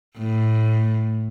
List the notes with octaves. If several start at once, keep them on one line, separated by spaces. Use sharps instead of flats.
A2